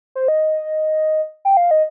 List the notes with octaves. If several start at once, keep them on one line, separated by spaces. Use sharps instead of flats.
C5
D#5
G5
F5
D#5